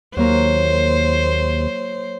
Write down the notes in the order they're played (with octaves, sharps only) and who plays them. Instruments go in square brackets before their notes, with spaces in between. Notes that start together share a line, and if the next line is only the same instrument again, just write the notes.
[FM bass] D#2 [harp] F#3 A#3 A#4 [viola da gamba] C5